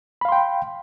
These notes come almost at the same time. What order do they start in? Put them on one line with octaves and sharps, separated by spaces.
B5 F5 C6 G5